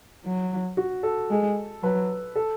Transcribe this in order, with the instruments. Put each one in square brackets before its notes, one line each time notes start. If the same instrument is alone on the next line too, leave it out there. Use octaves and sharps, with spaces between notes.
[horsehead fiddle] F#3
[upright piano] F#4
A4
[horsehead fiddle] G#3
[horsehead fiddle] F#3 [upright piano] B4
[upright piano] A4